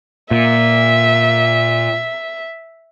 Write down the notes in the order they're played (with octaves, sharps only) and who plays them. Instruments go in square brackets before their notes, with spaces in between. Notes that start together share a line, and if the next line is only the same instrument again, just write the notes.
[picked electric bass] A#2 [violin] E5